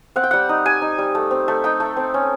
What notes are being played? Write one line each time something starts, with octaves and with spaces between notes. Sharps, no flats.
C4 F#5
G5
G3 F#5
D#4
G3 G#5
D#4
G3
A3
C4
A3
D#4 G5
A3
C4
C#4